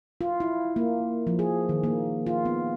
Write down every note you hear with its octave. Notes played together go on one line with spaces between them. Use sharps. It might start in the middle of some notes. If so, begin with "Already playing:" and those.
F4
E4
A#3
F3
G#4
D#3
A#3
F4
B3